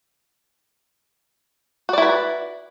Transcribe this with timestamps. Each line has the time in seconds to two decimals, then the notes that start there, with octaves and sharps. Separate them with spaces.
1.89 F#4
1.93 D5
1.98 E4
2.02 B4